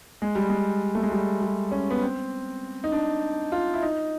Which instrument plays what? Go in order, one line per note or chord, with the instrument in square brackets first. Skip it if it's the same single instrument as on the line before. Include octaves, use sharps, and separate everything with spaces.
[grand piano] G#3
G3
G#3
A3
G#3
G3
G3
C#4
B3
C4
D#4
D4
F4
E4
D#4